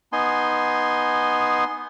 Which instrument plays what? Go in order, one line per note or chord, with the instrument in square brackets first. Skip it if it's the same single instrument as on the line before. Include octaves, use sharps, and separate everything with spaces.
[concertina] B3 D#4 G#5 C6